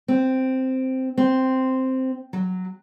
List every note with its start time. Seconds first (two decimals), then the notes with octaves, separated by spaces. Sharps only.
0.08 C4
1.18 C4
2.33 F#3